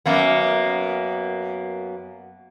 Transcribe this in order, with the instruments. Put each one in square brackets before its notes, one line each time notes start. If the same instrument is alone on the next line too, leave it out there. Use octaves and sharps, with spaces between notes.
[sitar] F#2 A#3 B3